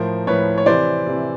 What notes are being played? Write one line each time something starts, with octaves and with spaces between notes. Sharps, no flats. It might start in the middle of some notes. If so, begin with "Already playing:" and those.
Already playing: A2 F3 A#4 C5
A2 F3 B4 C#5
C#5
C3 E3 C5 D5
C3 E3